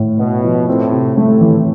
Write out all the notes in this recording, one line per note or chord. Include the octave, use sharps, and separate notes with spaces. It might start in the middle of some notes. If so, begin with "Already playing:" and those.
Already playing: A2
B2 B3
F3
A2 C4
C3
A2 A3
E3